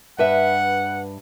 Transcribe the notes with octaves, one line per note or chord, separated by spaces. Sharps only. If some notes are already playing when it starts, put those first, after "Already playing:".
G2 B4 E5 F#5